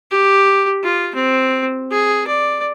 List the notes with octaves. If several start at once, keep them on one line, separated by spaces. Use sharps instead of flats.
G4
F4
C4
G#4
D5